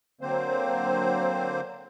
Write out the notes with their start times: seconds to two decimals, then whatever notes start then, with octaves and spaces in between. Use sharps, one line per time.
0.21 D3 F#3 A#3 C4 C5